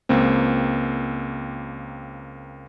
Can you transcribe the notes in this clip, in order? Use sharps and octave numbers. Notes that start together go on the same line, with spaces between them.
C#2 A#3 C4